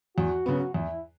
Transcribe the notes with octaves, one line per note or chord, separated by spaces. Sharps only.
E2 F#4
C#3 F#3 B3
E2 E4